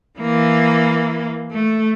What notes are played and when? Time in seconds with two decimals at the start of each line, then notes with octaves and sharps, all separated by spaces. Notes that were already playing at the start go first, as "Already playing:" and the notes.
0.19 E3 A#3
1.51 A3